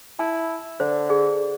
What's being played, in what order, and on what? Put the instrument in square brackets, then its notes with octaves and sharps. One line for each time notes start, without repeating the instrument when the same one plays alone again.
[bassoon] E4 [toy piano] A5
[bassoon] D3 [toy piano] C5
[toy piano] G#4 D5